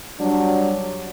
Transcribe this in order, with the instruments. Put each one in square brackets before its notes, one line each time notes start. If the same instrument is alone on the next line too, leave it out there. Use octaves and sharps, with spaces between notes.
[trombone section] F#3 G3 D4